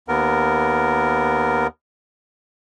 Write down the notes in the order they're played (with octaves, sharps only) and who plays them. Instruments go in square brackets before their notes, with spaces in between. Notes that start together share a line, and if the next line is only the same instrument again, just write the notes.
[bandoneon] D#2 B3 A#4